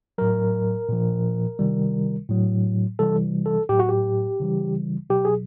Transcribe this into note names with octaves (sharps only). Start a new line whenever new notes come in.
A2 F#3 A#4
A#2 F3
C3 D#3 G3
A2 F#3
C3 E3 G3 A4
A4
A2 F#3 G4
F#4
G4
C#3 E3 G3
B2 F#3 G4
G#4